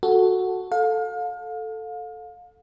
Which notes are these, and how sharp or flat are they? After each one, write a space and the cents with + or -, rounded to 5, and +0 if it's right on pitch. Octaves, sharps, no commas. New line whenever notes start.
F#4 +0 A4 +0
A4 +0 F5 +35